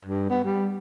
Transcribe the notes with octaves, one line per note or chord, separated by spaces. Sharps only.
G2
B3
G3